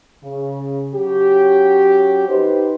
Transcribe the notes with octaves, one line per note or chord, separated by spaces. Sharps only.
C#3
F#3 C#4 G4
D#4 G4 B4 C5